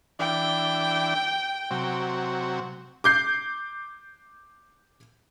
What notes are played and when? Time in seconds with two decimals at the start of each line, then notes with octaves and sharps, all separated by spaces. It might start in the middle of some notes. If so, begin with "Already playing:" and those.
0.19 E3 D4 G5
1.71 C3 F#3
3.04 D6 G6 C7